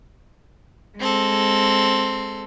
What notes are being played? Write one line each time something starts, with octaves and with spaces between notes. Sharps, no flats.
G#3 C4 A4